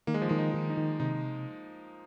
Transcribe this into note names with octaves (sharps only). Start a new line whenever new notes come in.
D#3 A#3
G#3
F3
D#3 G#3
D#4
D#3
D#4
D#3
C3 D#4